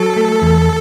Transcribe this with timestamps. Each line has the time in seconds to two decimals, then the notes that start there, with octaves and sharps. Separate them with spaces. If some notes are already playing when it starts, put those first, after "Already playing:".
Already playing: F#3 A4
0.16 A3
0.42 E2